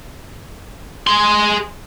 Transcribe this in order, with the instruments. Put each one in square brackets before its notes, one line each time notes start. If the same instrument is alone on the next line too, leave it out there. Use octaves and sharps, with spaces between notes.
[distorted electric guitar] G#4 C6